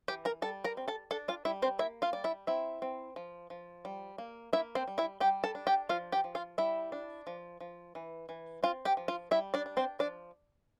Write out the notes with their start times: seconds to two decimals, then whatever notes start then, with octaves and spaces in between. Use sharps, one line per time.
0.08 E3 G4 G5
0.25 A#4 A#5
0.42 G3 A4 A5
0.64 A#4 A#5
0.77 C4
0.88 A4 A5
1.11 D4 A4 A5
1.28 F4 F5
1.45 G3 E4 E5
1.62 C4 C5
1.79 A#3 E4 E5
2.02 F4 F5
2.13 G3 D5
2.24 E4 E5
2.47 C4 E4 E5
2.82 C4
3.16 F3
3.50 F3
3.85 G3
4.18 A#3
4.53 A#3 E4 E5
4.75 C4 C5
4.88 G3
4.98 E4 E5
5.20 G3 G4 G5
5.44 A4 A5
5.55 D4
5.67 G4 G5
5.89 F3 F4 F5
6.12 G4 G5
6.24 F3
6.35 F4 F5
6.58 G3 E4 E5
6.92 D4
7.27 F3
7.61 F3
7.95 E3
8.29 E3
8.63 C4 F4 F5
8.85 G4 G5
8.97 F3
9.08 F4 F5
9.31 G3 E4 E5
9.54 D4 D5
9.66 D4
9.77 C4 C5
9.99 F3 D4 D5